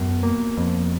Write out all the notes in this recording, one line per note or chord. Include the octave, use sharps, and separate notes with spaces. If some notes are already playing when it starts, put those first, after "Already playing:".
Already playing: F#2 B2
A#3
F2